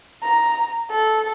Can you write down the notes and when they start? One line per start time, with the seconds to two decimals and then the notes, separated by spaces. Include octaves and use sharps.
0.23 A#5
0.90 A4